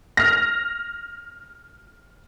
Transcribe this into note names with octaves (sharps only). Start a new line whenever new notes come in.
F6 A#6